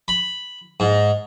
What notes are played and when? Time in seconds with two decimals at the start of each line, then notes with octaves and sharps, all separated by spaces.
0.08 B5
0.80 G#2